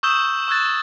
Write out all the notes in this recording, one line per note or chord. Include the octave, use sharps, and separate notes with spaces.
C#6 D#6 E6 G6 E7 G7
C#6 E6 F#6 G#6 A6